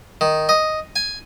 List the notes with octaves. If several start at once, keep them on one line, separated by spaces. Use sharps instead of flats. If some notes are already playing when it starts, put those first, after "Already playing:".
D#3
D#5
G#5